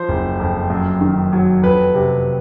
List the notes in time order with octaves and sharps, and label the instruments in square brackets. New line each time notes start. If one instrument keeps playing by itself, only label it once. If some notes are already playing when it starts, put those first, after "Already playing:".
Already playing: [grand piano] F3 C5
F#1
F2
F#2
D#3
F#3
F2 B4
C3